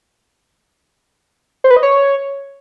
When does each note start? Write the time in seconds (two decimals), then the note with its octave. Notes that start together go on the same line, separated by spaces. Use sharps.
1.64 C5
1.70 B4
1.77 D#5
1.83 C#5